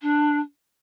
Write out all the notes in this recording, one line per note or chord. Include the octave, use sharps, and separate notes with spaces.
D4